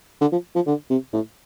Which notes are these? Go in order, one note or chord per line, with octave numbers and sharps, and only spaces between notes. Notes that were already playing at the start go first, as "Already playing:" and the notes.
D3
F3
F3
D3
C3
A2